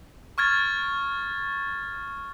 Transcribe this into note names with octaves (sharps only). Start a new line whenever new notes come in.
C#6 F6 G#6 A6